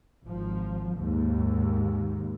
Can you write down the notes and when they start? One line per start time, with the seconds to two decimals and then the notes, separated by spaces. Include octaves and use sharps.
0.24 G#1 F3
0.96 D#2 G#2